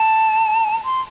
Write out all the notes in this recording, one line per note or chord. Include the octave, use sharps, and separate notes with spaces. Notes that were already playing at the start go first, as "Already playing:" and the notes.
Already playing: A5
C6